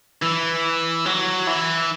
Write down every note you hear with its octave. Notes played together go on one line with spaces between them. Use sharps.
E3
F#3
E3